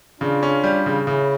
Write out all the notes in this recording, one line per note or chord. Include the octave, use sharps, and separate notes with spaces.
C#3 D4 F4
C#4
G3
C#3
C#3 C#4 E4